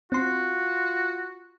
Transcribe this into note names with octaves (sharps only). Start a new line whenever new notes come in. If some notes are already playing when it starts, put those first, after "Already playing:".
C4 F4 F#4 C6